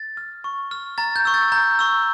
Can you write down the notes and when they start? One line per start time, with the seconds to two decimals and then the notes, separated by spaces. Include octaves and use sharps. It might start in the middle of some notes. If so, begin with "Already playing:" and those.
Already playing: A6
0.17 F6
0.44 C#6
0.71 F6
0.98 A#5 A6
1.16 G6
1.25 C#6 E6
1.34 A6
1.52 A#5 G6
1.79 C#6 E6